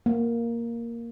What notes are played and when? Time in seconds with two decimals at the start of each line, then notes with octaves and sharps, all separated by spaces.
0.06 A#3